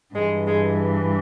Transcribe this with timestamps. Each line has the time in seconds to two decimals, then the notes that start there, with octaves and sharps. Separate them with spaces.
0.14 G2 E3 G#3
0.46 G#3